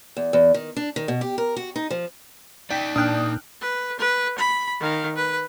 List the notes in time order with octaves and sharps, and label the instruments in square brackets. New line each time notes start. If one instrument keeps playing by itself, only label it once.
[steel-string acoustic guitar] E2
E2
D#3
D4
D#3
B2
G4
A#4
F#4
D#4
F3
[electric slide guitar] D#4 D5 [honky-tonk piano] G5 [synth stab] B6
[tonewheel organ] A#2 [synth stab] D4 G5 [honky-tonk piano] D#6 F6 F#6
[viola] B4
B4
B5
D#3 F5
B4